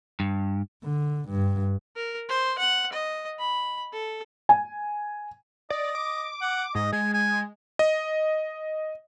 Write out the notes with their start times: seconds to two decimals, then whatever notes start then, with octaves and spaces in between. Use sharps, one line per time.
0.20 G2
0.84 D3
1.29 G2
1.96 A#4
2.29 C5
2.59 F#5
2.93 D#5
3.39 B5
3.93 A4
4.49 G#5
5.70 D5 D#5
5.95 D6
6.42 F#5
6.75 G#2 D#5
6.93 G#3 G#5
7.14 G#5
7.79 D#5